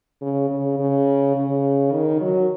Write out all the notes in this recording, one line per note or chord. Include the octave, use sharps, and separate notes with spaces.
C#3
C#3
C#3
C#3
D#3
F#3